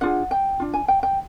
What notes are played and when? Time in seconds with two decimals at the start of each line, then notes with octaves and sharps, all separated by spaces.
0.01 D4 F4 G#4 F#5
0.31 G5
0.60 D4 F4
0.74 G#5
0.88 G5
1.03 G5